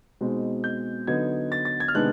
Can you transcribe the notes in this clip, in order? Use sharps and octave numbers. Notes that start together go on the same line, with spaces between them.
B2 G#3 C4 D#4
G6
D3 F#3 B3 D#4 G#6
A6
A6
G#6
F6
C3 D#3 G#3 B3 D4 F#6